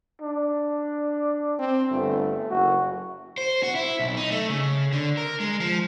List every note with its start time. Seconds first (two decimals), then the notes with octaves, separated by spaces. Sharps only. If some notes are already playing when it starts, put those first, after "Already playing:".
0.22 D4
1.59 C4
1.91 G1 A3
2.51 F#1 F#4
3.38 C5
3.63 F#4
3.75 E4
3.99 B1
4.17 D#4
4.31 A3
4.49 C#3
4.93 D3
5.17 A#4
5.40 G#3
5.60 F3